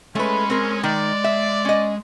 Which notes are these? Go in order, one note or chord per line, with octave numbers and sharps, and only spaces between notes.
G#3 A3 C#4 B4
C4 A#4
D#3 D5
E5
C#4 D#5